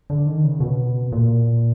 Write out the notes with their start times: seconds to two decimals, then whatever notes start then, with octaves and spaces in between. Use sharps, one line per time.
0.10 D3
0.27 D#3
0.44 C#3
0.60 B2
1.12 A#2